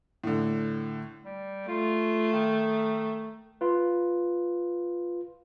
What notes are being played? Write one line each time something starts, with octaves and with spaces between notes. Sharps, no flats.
A2 D3
G3
A3 F4
D#3
F4 B4